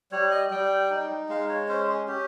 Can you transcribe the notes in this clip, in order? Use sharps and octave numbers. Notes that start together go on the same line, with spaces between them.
G3 C#5
D#5
G3 G5
D#4
G#3 F5
C#5
C#4 C5
G#4
C#4 G4